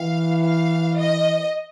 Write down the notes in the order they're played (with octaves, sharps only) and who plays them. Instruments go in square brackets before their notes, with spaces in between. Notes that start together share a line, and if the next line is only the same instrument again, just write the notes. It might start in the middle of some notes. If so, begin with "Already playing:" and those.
Already playing: [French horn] E3 [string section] F5
[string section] F5
D#5